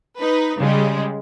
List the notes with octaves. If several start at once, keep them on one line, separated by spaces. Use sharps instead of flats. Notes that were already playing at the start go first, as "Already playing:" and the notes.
D#4 B4
C#3 G3 G#3